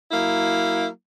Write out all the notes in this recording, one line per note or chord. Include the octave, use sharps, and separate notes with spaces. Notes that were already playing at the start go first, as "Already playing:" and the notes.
F#3 A#3 E4